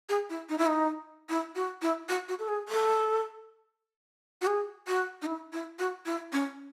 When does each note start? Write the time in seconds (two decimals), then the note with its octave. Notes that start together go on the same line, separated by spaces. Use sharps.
0.09 G#4
0.30 E4
0.49 D#4
0.58 E4
0.67 D#4
1.29 E4
1.55 F#4
1.82 E4
2.09 F#4
2.28 F#4
2.39 A4
2.48 G#4
2.68 A4
4.41 F#4
4.47 G#4
4.87 F#4
5.22 D#4
5.26 E4
5.53 E4
5.79 F#4
6.05 E4
6.32 C#4